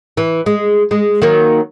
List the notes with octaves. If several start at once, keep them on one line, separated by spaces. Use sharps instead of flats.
E3
G#3
G#3
D#3 F#3 A#3